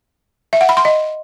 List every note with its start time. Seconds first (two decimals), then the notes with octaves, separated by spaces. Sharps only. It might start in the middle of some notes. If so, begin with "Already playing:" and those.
0.53 E5
0.61 F#5
0.69 B5
0.77 C6
0.85 D#5